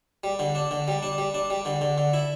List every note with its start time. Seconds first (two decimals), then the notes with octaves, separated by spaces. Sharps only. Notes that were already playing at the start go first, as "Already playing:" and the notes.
0.24 G3
0.39 D3
0.55 D4
0.71 D3
0.88 G3
1.03 D4
1.18 G3
1.34 D4
1.50 G3
1.65 D3
1.81 D3
1.98 D3
2.13 E4